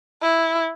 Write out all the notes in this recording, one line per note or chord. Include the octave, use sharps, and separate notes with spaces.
E4